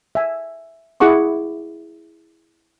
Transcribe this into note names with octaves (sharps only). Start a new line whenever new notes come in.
E5 G#5
E4 G#4 F#5 C#6 D6